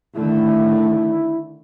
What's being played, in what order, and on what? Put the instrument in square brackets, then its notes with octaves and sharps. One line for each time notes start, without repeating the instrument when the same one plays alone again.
[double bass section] D3 D#3 A3 [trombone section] E4